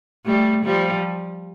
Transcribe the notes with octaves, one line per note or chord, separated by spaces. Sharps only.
G3 A3
F3 G3